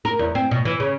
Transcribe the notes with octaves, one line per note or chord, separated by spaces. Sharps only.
A#4
E2
C4
B2
E3
C#3